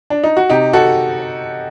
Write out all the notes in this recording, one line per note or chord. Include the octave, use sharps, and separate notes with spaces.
D4
D#4
F#4
C3 D#4 G4
F#4 A4